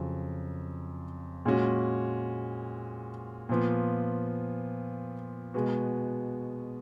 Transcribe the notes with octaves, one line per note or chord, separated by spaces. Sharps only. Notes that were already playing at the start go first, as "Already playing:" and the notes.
Already playing: F2 C#3 F#3
A#2 G#3 C#4 F#4
A#2 F3 B3
B2 G#3 B3 F#4